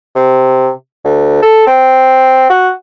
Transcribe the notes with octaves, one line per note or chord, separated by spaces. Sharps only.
C3
D2
A4
C4
F#4